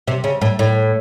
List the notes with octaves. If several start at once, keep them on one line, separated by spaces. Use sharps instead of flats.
C3
C#3
A2
A2